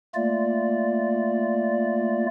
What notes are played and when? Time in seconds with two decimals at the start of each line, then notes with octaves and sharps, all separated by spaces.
0.15 A3 A#3 F4 D5